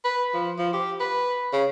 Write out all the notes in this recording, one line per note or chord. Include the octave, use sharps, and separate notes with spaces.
B4
F3
F3
G4
B4
C#3